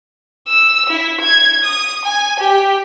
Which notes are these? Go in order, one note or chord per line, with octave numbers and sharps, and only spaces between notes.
E6
E4
G#6
D#6
G#5
G4